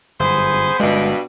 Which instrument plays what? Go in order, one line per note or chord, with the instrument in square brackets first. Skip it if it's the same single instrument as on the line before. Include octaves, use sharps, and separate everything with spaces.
[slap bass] G1 F#2 [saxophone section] B3 G#4 C5
[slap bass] G1 G#3 [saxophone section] G2 B2